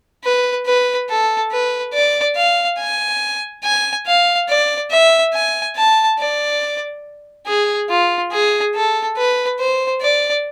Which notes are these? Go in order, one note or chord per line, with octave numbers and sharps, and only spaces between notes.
B4
B4
A4
B4
D5
F5
G#5
G#5
F5
D5
E5
G#5
A5
D5
G#4
F4
G#4
A4
B4
C5
D5